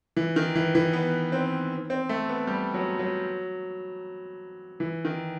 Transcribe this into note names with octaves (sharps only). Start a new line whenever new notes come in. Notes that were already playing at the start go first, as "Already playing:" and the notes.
E3
D#3
E3
E3
B3
C4
C4
A3
B3
G3
F#3
F#3
E3
D#3